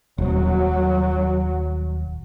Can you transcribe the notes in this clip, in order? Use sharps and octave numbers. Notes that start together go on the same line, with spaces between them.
D#1 F#3